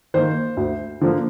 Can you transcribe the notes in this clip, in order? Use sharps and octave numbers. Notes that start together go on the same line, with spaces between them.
D#3 A#3 C5
D2
D3 F3 A#3